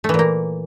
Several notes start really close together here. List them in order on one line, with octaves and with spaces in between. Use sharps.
A3 E3 A#2 A#3